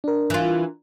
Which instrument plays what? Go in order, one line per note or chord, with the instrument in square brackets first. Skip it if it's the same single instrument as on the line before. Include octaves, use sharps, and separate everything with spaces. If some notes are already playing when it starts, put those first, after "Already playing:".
[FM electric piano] D4 A#4
[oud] E3 F4